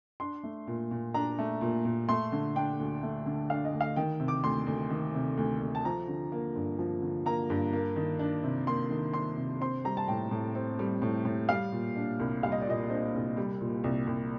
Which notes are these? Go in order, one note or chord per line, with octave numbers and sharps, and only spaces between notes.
D4 C6
A3
A#2
A#2
D4 A#5
A3
A#2
A#2
A3 C6
D3
D4 G5
D2
A3
D3
D4 F5
D#5
D2
F5
D#3 G5
C3
D6
D2 C6
D2
D#3
C3
D2
D2
A5
F3 A#5
D3
A#3
G2
F3
D3
A#3 A#5
G2
A#3
D#3
D4
C3
A#3 C6
D#3
D4 C6
C3
C4 C6
G3 A#5
A5
A2 G5
A2
C4
G3
A2
A2
G3 F5
A#2
D4
C2
G3 F5
D#5
D5
A#2 D#5
D4 C5
C2
G3
A#2
C2
C2